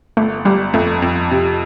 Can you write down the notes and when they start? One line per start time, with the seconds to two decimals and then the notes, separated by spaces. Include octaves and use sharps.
0.17 G1 A3
0.45 G1 G3
0.74 F2 A3
1.02 F2
1.31 C3